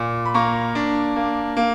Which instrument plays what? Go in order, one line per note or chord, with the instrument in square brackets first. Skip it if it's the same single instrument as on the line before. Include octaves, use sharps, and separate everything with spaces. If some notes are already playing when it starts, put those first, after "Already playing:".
Already playing: [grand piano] A#2
B5
A#3 A#5 C#6
D4
A#3
A#3